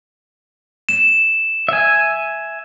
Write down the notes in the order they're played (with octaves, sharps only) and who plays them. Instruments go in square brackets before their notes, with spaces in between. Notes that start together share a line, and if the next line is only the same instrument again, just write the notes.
[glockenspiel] E7
[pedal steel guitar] E5 G#5